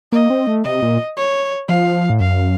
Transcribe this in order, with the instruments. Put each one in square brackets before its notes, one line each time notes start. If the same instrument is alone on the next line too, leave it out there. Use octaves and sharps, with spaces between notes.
[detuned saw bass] A#3 [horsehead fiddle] D#5
[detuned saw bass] C4
A3
[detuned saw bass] C3 [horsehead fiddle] D#5
[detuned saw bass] A#2
[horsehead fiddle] C#5
[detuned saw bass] F3 [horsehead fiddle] F5
[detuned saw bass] A2
[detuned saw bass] F#2 [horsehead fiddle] F5